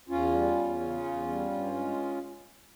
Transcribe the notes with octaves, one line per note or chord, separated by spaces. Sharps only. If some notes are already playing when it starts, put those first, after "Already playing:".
E2 C#4 F4
G3
E2
C#3
E2
G3
G2
G#3